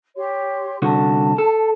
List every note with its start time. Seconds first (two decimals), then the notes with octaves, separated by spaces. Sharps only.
0.16 G4 C#5 C6
0.82 C2 D3 F#4 A5
1.38 A4